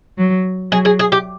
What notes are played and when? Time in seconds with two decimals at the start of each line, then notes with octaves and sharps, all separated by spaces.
0.18 F#3
0.71 F#3 G#4
0.85 G#4
0.99 G#4
1.12 G4